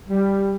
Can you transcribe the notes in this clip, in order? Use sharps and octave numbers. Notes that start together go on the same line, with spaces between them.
G3